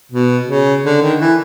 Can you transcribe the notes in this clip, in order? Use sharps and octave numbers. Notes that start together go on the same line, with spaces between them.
B2
C#3
D3
D#3
E3